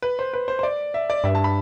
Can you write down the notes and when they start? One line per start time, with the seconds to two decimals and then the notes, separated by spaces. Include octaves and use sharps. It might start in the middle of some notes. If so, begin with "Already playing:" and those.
0.02 B4
0.19 C5
0.34 B4
0.48 C5
0.59 C5
0.63 D5
0.94 E5
1.10 D5
1.24 G2 E5
1.35 A5
1.44 B5